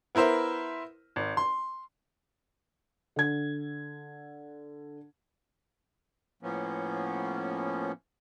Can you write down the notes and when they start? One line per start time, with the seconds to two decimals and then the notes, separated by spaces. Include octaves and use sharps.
0.15 B3 E4 A#4 C5 E5
1.16 G#1
1.37 C6
3.16 D3 G#6
6.43 A2 F3 A#3 B3 C#4